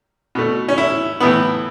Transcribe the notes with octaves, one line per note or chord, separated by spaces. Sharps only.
B2 A3
C#4
E4
A2 E3 B3